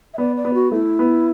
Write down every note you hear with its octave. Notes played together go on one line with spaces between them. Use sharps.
E5
B3 D5
D5
B3
F#4
A3 E4
B3